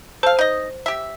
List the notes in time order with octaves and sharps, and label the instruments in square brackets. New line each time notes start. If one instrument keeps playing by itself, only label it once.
[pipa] A4 F5 [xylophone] C5
[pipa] D#4 D#5
G4 E5